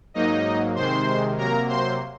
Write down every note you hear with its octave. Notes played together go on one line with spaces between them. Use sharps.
G#2 F#3 A#3 D#4 D#5
C3 D#3 G#3 C5 C6
C3 F#3 A#3 A#4 A#5
C5 C6